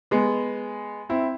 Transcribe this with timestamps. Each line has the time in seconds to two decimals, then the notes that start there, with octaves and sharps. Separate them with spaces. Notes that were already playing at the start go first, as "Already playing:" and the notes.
0.11 G#3 B3
1.09 C4 E4